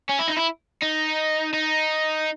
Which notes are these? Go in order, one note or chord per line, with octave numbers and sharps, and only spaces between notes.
C#4
E4
D#4
E4
D#4
D#4